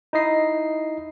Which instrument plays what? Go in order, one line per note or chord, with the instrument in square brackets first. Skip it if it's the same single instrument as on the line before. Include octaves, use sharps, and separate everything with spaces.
[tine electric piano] D#4 E4 D#5 C7